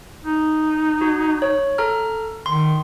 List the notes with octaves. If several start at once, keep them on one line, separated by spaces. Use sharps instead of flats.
D#4
F#4
C#5
A4 A#5 F6
D#3 C6